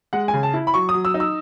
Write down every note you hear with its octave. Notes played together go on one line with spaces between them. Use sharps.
G#3 F#5
G#5
C#3
A5
E4
B5
F#3 C#6
D#6
F#3
E6
D#4
E6